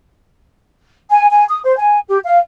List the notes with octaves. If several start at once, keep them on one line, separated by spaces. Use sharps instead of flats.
G#5
G#5
D#6
C5
G#5
G4
F5